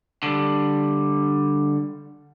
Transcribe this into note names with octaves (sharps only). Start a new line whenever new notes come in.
D3 G3